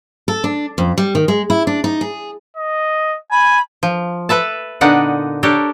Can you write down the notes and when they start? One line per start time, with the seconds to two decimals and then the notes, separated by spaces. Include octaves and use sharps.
0.28 A4
0.44 D4
0.78 F2
0.98 G3
1.15 D#3
1.28 G#3
1.50 E4
1.67 D4
1.84 D#4
2.01 G#4
2.57 D#5
3.31 G#5 B5
3.83 F3
4.29 A4 B4 E5 A5
4.81 A#2 D3 B3 D4 D#4 F#5
5.43 D4 G4 A4 A#4 C#5